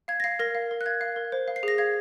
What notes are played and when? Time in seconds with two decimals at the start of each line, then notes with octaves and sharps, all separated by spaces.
0.08 F5 G#6
0.20 A#6
0.24 F5 C7
0.39 A#4 A#6
0.55 F5
0.71 A#4
0.81 F#6
0.86 F5 G#6
1.01 F5
1.16 A#4
1.32 C5
1.48 F5
1.56 C7
1.63 G#4 A#6
1.78 F5 G#6